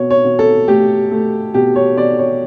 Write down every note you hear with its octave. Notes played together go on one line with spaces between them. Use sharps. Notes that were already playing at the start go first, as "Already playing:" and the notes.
Already playing: B2 C#5
C#5
B2
A4
A3 G4
A3
B2 G4
C#5
B2 D5
C#5